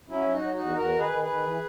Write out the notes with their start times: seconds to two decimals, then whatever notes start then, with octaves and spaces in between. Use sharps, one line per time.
0.08 F#3 C#4 E4
0.25 F#3
0.31 D#4 F#4
0.42 F#3
0.54 D#4 F#4
0.60 E2
0.76 E2 F#4 A#4
0.93 D#3
0.99 G#4 B4
1.10 D#3
1.22 G#4 B4
1.28 D#3
1.44 E3